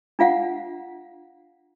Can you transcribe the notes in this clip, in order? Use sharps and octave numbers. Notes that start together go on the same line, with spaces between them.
D4 F4 F5 F#5